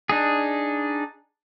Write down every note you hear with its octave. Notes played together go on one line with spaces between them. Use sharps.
D4 D#4 G#4